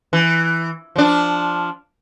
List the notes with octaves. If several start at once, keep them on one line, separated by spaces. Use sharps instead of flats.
E3
F3 D4